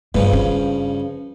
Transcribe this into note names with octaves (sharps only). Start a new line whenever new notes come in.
G1 G2 C#3 F3 A#3
C#4